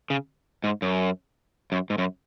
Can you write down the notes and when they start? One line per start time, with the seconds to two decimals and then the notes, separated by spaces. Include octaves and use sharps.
0.10 C#3
0.64 G#2
0.82 F#2
1.72 F#2
1.90 G#2
1.98 F#2